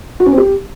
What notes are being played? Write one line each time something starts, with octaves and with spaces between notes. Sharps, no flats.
F#4
C#4
C4
G4